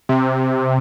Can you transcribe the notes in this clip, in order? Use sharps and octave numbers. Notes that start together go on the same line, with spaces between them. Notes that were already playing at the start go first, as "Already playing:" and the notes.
C3